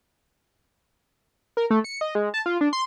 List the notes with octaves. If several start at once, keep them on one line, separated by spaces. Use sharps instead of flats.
A#4
A3
C#7
D#5
G#3
A5
F4
D4
C6